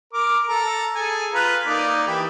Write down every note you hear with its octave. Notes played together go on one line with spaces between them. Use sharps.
A#4 D6
A4 A#5
G#4 A4 G#5
F4 B4 A#5
A#3 D#4 D5
E3 G4 B5